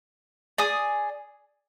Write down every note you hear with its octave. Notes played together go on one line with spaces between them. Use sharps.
G#4 D5 G#5 D#6